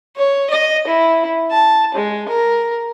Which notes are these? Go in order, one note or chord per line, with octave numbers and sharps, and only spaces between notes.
C#5
D#5
E4
A5
G#3
A#4